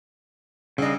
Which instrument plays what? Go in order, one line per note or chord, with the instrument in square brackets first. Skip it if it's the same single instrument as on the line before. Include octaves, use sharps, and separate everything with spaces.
[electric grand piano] C2 D4 [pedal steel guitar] C#3 D#5